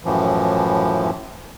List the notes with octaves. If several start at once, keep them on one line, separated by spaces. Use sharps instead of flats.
F#2 A2 E3 F3